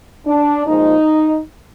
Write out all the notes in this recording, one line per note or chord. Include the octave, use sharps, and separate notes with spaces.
D4
A#2 F3 G#3 D#4